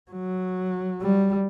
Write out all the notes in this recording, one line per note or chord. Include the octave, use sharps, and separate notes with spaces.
F#3
G3